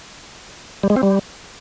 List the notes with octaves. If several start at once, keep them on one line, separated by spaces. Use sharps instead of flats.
G3
G#3
C4
G3